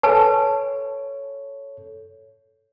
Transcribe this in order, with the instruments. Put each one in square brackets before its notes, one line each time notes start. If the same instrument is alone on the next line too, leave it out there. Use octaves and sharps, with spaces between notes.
[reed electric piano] A4 C#5 [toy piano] B4 G#5 A5